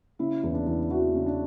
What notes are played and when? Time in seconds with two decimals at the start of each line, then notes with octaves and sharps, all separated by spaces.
0.19 C#3 E4
0.43 E2
0.54 D4
0.66 E2
0.90 E3 F#4
1.14 C#3
1.26 D4